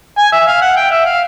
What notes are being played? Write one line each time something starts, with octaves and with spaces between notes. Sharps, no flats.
G#5
E5
F5
F#5
G5
E5
F5